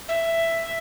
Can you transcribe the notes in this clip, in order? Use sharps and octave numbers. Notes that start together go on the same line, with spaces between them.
E5